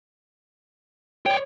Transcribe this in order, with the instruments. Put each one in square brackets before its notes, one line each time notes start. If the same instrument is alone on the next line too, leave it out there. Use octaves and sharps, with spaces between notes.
[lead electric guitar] C#5 D5 [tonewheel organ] G5